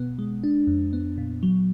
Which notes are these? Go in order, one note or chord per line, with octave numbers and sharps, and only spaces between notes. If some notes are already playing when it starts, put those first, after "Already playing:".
Already playing: B2 B3
G#3
D4
F2
B3
A#2
F#3